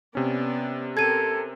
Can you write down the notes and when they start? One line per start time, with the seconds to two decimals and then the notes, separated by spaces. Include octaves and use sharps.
0.15 C3 B3 C#4 D5
0.97 C4 A4 A#4 G#6 D#7